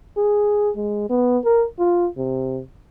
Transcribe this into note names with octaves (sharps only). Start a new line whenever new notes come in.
G#4
G#3
B3
A#4
F4
C3